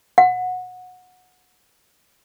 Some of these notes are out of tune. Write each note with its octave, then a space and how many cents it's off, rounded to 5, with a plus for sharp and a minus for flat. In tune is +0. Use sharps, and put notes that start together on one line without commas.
F#5 -20